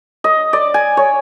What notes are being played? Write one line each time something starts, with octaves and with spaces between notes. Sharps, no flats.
D#5
D5
G#5
C#5